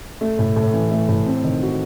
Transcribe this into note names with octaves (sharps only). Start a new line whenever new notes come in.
A3
A2
A2
E3
A3
A2
C4
D#3
F#4